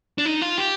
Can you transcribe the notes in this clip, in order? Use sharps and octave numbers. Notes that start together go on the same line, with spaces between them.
D4
D#4
F4
G4